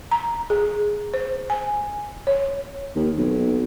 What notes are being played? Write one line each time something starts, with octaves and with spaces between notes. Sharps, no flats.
A#5
G#4
C5
G#5
C#5
D#2
B1